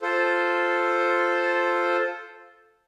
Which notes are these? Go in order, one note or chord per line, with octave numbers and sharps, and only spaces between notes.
F4 A4 C5